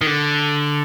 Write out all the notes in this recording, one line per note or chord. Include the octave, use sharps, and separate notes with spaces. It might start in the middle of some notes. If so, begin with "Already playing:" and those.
D#3
D3